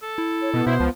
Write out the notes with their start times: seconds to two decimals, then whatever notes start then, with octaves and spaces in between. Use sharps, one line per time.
0.02 A4
0.18 E4
0.42 C#5
0.54 B2 B3
0.67 B2 E4 C5
0.80 C#2 F3